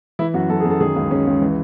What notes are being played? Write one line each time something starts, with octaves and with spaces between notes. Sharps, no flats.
E3 E4
F#2 F#4
F#2 A4
G#4
F#2
A4
D#3 G#4
C#2
C#2 C#4
C#2
E3